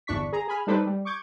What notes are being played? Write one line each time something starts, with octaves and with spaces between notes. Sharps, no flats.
G1 E2 D4 C#6 B6
G#4 A#5
G#4 G#5 B5 F6
G3 D4 D#4 A4 B4 C5
G3
C#6 D6 G6 G#6